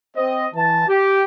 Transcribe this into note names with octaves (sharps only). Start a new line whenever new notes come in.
C4 D#5
E3 A5
G4